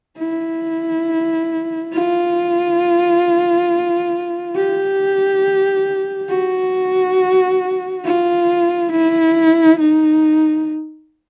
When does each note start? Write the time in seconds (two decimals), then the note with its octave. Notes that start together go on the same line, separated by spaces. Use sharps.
0.18 E4
1.93 F4
4.56 G4
6.29 F#4
8.05 F4
8.92 E4
9.80 D#4